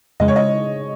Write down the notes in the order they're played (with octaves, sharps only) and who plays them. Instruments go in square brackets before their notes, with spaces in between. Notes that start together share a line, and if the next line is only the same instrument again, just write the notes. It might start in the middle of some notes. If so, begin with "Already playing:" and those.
[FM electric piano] F2 C#3 G#3 [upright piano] D#5
[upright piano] C#5
D#5